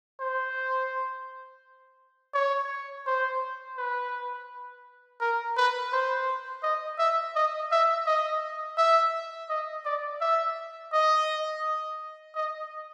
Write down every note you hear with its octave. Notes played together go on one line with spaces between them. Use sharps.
C5
C#5
C5
B4
A#4
B4
C5
D#5
E5
D#5
E5
D#5
E5
D#5
D5
E5
D#5
D#5